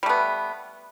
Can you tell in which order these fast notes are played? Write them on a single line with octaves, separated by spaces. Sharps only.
G3 A3 B3